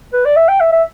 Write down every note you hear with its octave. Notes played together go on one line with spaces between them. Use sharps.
B4
D5
E5
G5
E5
E5